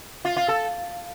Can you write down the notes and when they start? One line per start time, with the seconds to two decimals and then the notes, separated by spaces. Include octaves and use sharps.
0.25 F4
0.37 F4
0.48 A4